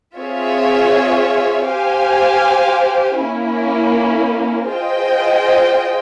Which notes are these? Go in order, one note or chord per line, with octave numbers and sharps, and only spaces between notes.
C4 F4 G#4 C#5 E5
G4 C5 F5 G#5
A#3 C#4 E4
F4 G#4 C5 D#5 G5